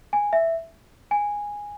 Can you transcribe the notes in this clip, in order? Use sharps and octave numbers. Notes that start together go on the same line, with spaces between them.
G#5
E5
G#5